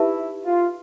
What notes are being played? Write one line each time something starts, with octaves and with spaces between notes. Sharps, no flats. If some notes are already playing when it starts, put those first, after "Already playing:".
Already playing: D#4 E4 G4 B4 E5 A5
F4